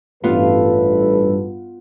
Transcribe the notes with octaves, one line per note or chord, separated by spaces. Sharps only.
A1 G2 B3 F4 A4 B4